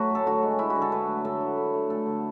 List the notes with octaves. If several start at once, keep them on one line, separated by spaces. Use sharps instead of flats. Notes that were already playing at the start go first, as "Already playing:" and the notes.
Already playing: F#3 A3 F#4 B4
A2 A4
D3 F#4
G#3
G#3 E4
F#4
D3
A4
A3 B4
F#3
D3 A4
D3
D3
A3
A3 A4
D3